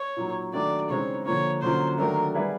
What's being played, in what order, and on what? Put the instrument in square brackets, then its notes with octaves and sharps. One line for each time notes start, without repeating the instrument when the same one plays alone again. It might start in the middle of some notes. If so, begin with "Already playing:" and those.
Already playing: [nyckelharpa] C#5
[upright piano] A#2 F#3 A#3 D#4
[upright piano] D#3 F#3 A3 D4 [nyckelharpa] D5
[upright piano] C#3 E3 G#3 C4 D#4 [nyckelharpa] C#5
[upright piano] D3 F3 A#3 [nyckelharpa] C#5
[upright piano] D3 F#3 A#3 C#4 F4 [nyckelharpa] C5
[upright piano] D#3 F#3 A3 D4 [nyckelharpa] A#4
[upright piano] G3 B3 E4 G#4 B4